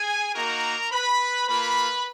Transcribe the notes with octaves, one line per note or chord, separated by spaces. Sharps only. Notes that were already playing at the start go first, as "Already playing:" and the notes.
Already playing: G#4 G#5
A#3 D#4 F#4 A#4 A#5
B4 B5
A#3 F4 B4 B5